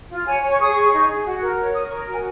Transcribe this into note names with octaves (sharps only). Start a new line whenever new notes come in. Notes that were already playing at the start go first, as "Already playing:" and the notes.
F4
C#5 G#5
C#5
C#6
G#4 D#6
G#4 C#6
D#4
G#4
F#4
A#4
C#5
A#4 D#6
C#6
A#4
F#4 G#5